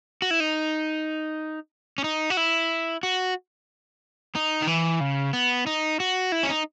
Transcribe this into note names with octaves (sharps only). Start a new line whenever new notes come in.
F#4
E4
D#4
C#4
D#4
F#4
E4
F#4
D#4
D#3
E3
C#3
B3
D#4
F#4
E4
C#4
D#4